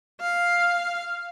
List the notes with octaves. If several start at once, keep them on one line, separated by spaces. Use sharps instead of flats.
F5